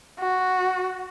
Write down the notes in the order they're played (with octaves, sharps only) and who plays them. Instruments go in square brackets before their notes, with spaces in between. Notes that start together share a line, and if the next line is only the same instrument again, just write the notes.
[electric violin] F#4